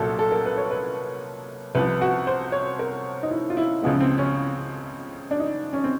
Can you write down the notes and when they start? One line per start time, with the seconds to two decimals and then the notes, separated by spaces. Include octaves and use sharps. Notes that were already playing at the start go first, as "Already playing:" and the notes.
Already playing: C2 A#2 F#3 A4
0.19 A4
0.32 A#4
0.45 B4
0.58 C#5
0.71 B4
1.75 C2 C3 F3 B4
2.01 F#4
2.27 C5
2.52 C#5
2.79 A#4
3.23 D#4
3.31 E4
3.50 F4
3.57 E4
3.82 C#2 C#3 F3 G#3 B3
4.00 C4
4.18 C#4
5.31 D4
5.39 D#4
5.73 C#4
5.84 C4